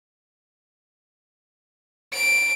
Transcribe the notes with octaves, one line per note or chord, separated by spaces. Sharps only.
D7